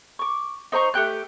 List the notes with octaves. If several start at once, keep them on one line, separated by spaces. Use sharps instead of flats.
C#6 D6
D#4 C5 A#5 C#6
A3 G4 G5 F#6